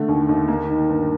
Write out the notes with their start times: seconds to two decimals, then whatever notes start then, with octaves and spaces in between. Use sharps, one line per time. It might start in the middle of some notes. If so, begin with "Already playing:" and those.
Already playing: D3 A3
0.08 D#2
0.29 D#2
0.48 A#3
0.69 D#3
0.89 G2